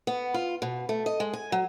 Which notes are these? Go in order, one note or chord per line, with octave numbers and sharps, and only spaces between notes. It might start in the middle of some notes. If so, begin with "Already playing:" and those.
B3
F4
B2
A3
D#5
G#3
G#5
F#3